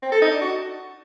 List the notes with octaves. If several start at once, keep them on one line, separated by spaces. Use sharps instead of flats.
C4
A4
D#4
D4
F#4